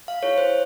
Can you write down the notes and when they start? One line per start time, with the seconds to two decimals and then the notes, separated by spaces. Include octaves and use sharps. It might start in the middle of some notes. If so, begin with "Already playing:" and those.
0.08 F5
0.23 E4 G#4 C#5
0.38 C5